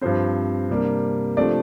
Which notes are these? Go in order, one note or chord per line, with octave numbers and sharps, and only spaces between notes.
G2 F3 C4 C5
C3 G3 A#3 D4
C3 F3 A3 D4 D5